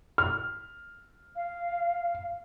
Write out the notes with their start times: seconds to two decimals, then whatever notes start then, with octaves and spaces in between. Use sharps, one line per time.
0.18 F6
1.36 F5